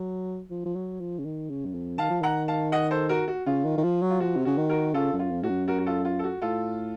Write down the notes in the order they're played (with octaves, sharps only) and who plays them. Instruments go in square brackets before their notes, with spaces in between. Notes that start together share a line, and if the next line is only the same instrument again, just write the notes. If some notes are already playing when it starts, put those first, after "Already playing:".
Already playing: [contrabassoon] F#3
F3
F3
F#3
F3
C#3
D#3
C#3
F#2
F2
[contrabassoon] D#3 [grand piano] F5 A5
[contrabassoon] F3
[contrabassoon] D#3 [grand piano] F#5 A#5
[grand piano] F5 A5
D#5 F#5
A4 C5
F#4 A#4
F#4
[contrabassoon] C#3 [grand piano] F4
[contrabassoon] D#3
D#3
F3
F#3
[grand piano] F4
[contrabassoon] F3 [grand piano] F#4
[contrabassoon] C3
[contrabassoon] C#3 [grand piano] F#4
[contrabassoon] D#3
[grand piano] F#4 A#4
[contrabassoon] C#3 [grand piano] F4 A4
[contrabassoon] F#2
[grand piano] F4
[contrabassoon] F2
[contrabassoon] A2 [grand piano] F#4
[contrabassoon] F#2
[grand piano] F#4 A#4
F#4
F4 A4
F4
A4
F#4
[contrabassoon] A2 [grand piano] F4 A4